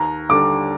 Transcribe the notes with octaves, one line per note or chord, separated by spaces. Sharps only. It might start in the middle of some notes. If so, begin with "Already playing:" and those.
Already playing: D#2 A#5
D3 G3 D4 D6